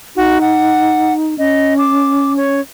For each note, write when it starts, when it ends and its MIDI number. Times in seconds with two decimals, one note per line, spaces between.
0.16 1.37 63
0.16 0.38 66
0.41 1.13 78
1.38 2.61 61
1.38 1.76 75
1.78 2.33 86
2.37 2.60 73